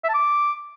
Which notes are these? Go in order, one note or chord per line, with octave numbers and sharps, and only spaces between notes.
E5
A5
D6